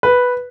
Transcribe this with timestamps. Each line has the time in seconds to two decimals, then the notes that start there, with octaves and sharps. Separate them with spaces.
0.03 B4